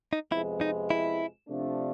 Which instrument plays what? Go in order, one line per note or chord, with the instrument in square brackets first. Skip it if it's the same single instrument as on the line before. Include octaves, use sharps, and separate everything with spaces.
[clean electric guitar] D#4
[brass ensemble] F2 C3 F3 G#3 B3 [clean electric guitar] E4
[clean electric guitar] D#4
E4
[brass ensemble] C3 F3 A3 D4